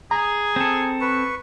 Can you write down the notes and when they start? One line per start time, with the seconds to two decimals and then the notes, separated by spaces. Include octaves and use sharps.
0.11 G#4 A#5
0.56 C4 A4
1.01 B4 C#6